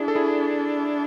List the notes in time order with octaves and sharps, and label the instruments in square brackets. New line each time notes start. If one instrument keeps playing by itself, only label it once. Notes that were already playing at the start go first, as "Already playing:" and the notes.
Already playing: [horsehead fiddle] D4 [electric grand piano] E4 G#4
[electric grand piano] A4
E4 G#4